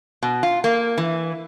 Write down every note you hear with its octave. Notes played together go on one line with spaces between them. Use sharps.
B2
F4
A#3
E3